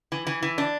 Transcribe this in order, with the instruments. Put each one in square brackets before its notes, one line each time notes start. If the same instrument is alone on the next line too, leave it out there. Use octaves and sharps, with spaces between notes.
[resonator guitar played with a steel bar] E3
E3
E3
D4